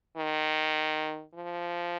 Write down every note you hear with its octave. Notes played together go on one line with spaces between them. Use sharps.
D#3
F3